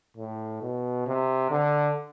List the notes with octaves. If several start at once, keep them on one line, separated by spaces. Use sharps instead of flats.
A2
B2
C3
D3